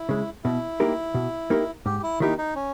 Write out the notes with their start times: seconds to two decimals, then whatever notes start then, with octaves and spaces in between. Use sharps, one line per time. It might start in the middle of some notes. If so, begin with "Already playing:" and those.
Already playing: E4
0.09 C#3 G#3
0.44 B2 E4
0.80 A#3 D#4 G4 A#4
1.14 B2
1.50 A#3 D#4 G4 A#4
1.86 G#2 G4
2.03 E4
2.20 D#3 A#3 D#4 E4 G4
2.38 D#4
2.56 C#4